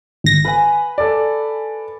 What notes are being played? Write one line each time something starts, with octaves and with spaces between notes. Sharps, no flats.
G#1 A#6
B4 G#5
A4 D5